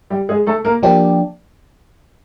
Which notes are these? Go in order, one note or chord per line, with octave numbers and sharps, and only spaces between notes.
G3 G4
G#3 G#4
A3 A4
A#3 A#4
F3 A#3 D4 G4